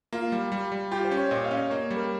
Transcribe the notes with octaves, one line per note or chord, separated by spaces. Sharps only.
A#3 F4
G3
G3
G3
F4 G4
C5
C#4
C#5
A#2 D#5
F5
C#4
D#5
A#3 C#5
G3
A#4